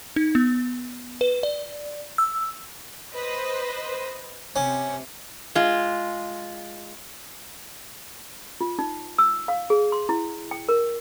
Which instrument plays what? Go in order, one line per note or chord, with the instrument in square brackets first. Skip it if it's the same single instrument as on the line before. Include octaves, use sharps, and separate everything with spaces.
[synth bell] D#4
B3
B4
D5
E6
[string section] B4 C5 D#5
[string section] C3 [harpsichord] C#4
[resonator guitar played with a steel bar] G#3 F4
[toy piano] F4
D#4
E6
F5
G#4
C6
E4
G5
A#4